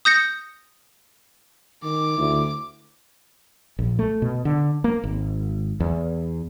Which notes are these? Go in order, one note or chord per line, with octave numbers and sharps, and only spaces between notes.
D#6 G6 A#6 C#7
D#3 D6
D2 E4
A#1
A3
B2
D3
A#3
G#1
E2